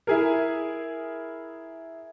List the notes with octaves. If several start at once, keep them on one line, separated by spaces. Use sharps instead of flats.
E4 G#4 A#4